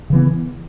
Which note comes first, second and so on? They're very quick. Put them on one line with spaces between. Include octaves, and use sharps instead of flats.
C#3 E3 B3